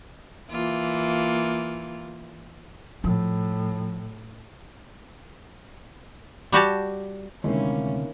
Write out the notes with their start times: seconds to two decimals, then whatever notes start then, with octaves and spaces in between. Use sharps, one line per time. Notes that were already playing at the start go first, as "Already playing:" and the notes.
0.50 E3 A#3 F4
3.04 A2 F3
6.52 G3 F#4 G4 A5
7.44 D2 C3 D#3 G#3 A#3 C#4 E4